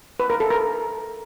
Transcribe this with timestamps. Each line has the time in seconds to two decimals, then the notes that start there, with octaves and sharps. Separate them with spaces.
0.20 B4
0.30 A#4
0.40 A4
0.50 A#4